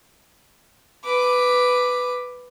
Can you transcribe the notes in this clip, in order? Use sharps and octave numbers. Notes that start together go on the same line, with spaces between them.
B4 D6